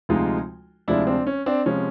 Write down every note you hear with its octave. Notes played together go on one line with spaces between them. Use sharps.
D2 C3 F3 G#3 D#4 F4
D2 C3 F3 G#3 D4 E4
C4 D4
C#4
C4 D4
C3 F3 G#3 C#4